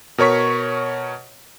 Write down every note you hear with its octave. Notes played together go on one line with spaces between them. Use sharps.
B2 A#4 C#5 C#6 B6